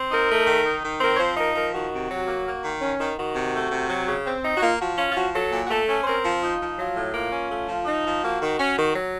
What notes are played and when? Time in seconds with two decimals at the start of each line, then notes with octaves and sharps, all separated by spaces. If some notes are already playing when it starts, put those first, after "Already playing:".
Already playing: C4
0.10 D#4 A#4
0.29 A3
0.47 D#3
0.65 D#4
0.83 D#3
1.01 C4 A#4
1.15 C#5
1.19 F3 C5
1.37 D#4 A#4
1.55 F3 A#4
1.73 D#3 F#4
1.91 C3
2.10 F#3
2.28 A#3
2.46 A#3
2.63 D#3
2.81 C#4
3.00 D#3
3.17 D#3 F#4
3.35 C3
3.53 A3
3.71 C3
3.89 F#3
4.07 C#3
4.26 C4
4.44 D#4
4.55 F#4
4.62 A#3 F4
4.79 F3 F#4
4.97 C#4 F4
5.10 F4
5.15 F3 F#4
5.34 F#3 A4
5.52 A#2
5.65 F#4
5.69 A3 A4
5.88 C#4
6.02 C5
6.06 C4 A#4
6.23 F3
6.41 D#4 F4
6.60 F3
6.78 F#3 F4
6.95 A2
7.13 A#3 F4
7.32 C#4
7.50 A3
7.68 F3
7.85 D#4
8.05 F3
8.22 A#3 F#4
8.41 D#3
8.58 C#4
8.77 D#3
8.94 F#3